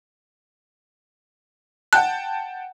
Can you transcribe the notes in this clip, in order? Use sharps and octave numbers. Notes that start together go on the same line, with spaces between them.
F#5 G5 A5 F#6